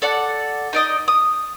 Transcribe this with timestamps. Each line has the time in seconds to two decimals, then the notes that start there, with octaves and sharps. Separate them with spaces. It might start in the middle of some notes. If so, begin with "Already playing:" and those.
0.02 A4 D5 F#5
0.73 D#4 D5 D#5
1.08 D#6